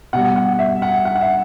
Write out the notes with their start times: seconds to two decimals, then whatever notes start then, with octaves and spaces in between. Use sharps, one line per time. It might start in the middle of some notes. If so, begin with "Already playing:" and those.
0.13 B2 G3 F#5
0.36 F#5
0.59 E5
0.82 F#5
1.05 F#5
1.16 F#5
1.21 E5